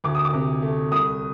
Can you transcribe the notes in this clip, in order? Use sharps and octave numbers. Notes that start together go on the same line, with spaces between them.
D2 D6
D#6
D6
C3
A3
C2 D#6